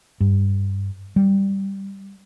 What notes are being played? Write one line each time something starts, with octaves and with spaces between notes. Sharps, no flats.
G2
G3